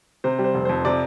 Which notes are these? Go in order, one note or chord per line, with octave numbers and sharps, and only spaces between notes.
C3 C5
G3
C5
F1
F2 C5
C3 D5